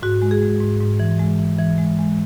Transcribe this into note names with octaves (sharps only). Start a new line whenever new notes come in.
G#2 F#4
G#3
G#4
G#3
G#2
G#2
E3
G#3
E3
E3
G#3
G#3